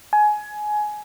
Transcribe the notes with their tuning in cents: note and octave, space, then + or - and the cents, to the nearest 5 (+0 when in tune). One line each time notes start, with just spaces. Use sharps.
G#5 +20